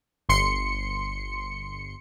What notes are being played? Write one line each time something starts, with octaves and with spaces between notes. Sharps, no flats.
G1 C6 C#7